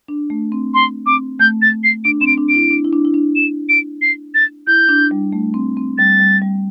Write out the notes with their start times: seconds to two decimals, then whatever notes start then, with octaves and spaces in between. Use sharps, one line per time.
0.08 D4
0.30 A3
0.52 C4
0.74 C6
1.06 C4 D6
1.39 A3 G6
1.62 A6
1.84 C7
2.04 D4 D7
2.21 C4 E7
2.27 D7
2.38 D4
2.49 D7
2.55 E4
2.70 D4
2.84 E4
2.93 D4
3.05 E4
3.14 D4
3.36 E7
3.69 D7
4.02 C7
4.35 A6
4.67 E4 G6
4.89 D4
5.11 G3
5.33 A3
5.54 C4
5.77 C4
5.98 G3 A6
6.20 G3
6.42 G3